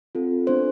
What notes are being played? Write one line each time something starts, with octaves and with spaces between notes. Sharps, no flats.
C4 F4 A4
B3 D4 A4 C5